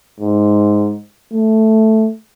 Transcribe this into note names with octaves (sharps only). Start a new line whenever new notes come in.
G#2
A3